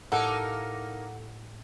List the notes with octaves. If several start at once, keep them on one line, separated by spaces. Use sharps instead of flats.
A2 A#3 D#4 G4 A4 A#4 F#5